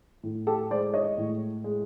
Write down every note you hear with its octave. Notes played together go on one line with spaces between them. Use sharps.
A2
G4 A4
G#3 C5 D5
C#5 D#5
A2
G#3